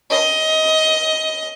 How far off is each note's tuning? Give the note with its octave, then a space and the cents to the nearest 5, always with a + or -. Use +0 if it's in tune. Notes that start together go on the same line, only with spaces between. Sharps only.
D#5 +20